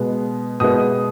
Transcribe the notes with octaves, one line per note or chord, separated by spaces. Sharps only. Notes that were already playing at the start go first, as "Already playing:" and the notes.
Already playing: B2 G#3 B3
B2 G#3 B3 D#6